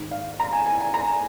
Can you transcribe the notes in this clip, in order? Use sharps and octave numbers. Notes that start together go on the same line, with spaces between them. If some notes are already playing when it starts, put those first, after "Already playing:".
Already playing: G#2 D#3
F5
A#5
G#5
G#5
G#5
A#5